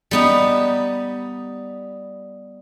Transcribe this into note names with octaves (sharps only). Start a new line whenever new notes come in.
G3 B3 D#4